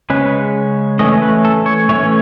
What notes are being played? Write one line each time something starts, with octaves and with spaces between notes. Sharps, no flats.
C#3 G#3 C#4 B4
E3 A3 C#4 D#5
B4
A4
C#5
E3 A3 C#4 C#5